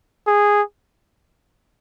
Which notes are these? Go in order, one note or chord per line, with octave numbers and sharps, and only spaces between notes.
G#4